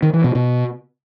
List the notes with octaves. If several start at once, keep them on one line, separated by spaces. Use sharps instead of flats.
D#3
E3
B2
B2